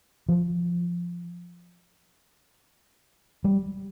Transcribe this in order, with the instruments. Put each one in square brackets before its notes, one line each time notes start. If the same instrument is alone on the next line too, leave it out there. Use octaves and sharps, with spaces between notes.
[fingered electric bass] F3
G3